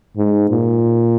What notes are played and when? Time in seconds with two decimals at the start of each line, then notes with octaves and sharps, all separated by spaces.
0.17 G#2
0.50 A#2